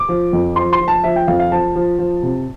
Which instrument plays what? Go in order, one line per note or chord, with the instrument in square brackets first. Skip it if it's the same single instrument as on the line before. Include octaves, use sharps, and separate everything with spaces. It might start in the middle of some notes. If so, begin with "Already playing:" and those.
Already playing: [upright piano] D6
F3
F2
F3 C6
C6
F3
A5
F3 E5
G5
F2 F5
F5
F3 A5
F3
F3
C3